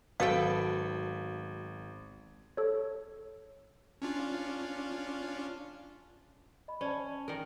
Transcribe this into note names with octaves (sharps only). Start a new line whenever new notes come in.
G#1 F#3 B3 A4 F5 G5
A4 C#5
C#4 D4 F4
D#5 B5
C#4 D5 A5
D#3 A#4 D5